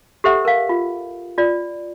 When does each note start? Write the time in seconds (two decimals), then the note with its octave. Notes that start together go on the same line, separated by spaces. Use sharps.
0.24 G4 A4 C5 E5 F#5
0.45 A#4 F5
0.69 F4
1.38 F4 D5